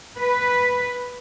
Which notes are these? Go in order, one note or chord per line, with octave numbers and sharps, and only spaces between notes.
B4